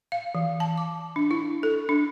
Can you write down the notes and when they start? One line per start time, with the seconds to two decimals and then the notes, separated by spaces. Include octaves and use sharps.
0.12 F5
0.35 E3
0.60 A5
0.78 D6
1.16 D4
1.31 E4
1.63 A4
1.89 D4